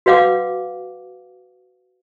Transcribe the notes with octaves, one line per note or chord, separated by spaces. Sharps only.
F#4 B4 F5 F#5 D6